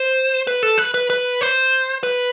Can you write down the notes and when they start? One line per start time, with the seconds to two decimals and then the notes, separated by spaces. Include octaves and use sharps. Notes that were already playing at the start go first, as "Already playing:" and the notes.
Already playing: C5
0.47 B4
0.63 A4
0.78 B4
0.94 B4
1.10 B4
1.41 C5
2.03 B4